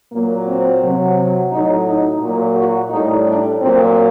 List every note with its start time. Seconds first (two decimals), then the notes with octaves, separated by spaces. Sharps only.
0.11 A#2 F#3 A#3
0.47 C4
0.82 C3 F#3
1.52 A2 F#3 D#4
1.86 D#4
2.21 A#2 F#3
2.55 F#4
2.90 A2 G3 D#4
3.25 D4
3.60 A#2 F#3 C4